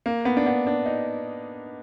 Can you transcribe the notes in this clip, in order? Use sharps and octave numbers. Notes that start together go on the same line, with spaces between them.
A#3
B3
D4
B3
D4
D#4